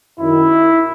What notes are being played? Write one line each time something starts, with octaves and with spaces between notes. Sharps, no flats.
F#2 D#3 E4